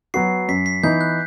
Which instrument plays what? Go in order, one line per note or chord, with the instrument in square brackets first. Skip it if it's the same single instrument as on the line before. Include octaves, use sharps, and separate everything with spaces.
[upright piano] F#3 B3 F#4 [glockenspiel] C7
[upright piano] F#2 [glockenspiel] B6
[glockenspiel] B6
[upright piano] E3 B3 D#4 [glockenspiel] G6
[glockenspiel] F#6